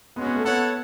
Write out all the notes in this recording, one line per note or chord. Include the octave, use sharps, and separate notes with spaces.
G#3 B3 C#4 F#4
B3
A3
B3 E4 A4 C#5 F#5